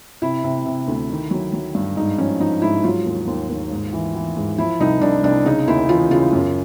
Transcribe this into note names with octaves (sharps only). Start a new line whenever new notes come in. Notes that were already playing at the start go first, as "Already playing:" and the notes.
C3 E4
C3
C3
D2
D#3
F#3
F#3
G2
G#2 D#4
F3 C#4
F3 D#4
G#2 E4
F#3 F4
D#2
D#2
D#2
G#2
E3
E3
G#2
F3 E4
C2 D#4
C2 D4
C2 D4
C#3 D#4
D#2 E4
E3 F4
C#3 F4
F#2